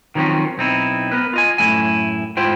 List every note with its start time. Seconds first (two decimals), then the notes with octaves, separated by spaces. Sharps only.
0.15 D#3 F3 F#3 A#3 C4 C#4
0.58 B1 C4 D#4 E4
1.12 B3 A#4 B4
1.33 F4 D#5 G#5
1.58 F#2 A2 A3 E4 G#5
2.37 G#2 E4 F4 C5 G5